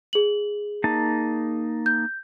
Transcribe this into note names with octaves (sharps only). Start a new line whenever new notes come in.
G#4 F#7
A#3 D#4 A5
G6